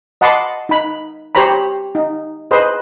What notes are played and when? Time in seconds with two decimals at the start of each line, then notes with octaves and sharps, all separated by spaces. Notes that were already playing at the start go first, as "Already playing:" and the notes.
0.21 D#5 F#5 A5 B5 C6 D6
0.69 D#4 B5
1.35 G4 C5 C#5 A#5 B5
1.95 D#4
2.51 G#4 B4 C5 D#5